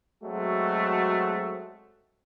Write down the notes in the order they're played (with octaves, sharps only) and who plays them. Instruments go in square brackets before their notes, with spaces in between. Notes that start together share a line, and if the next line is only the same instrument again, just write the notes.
[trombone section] F#3 G#3 A3 C4 F#4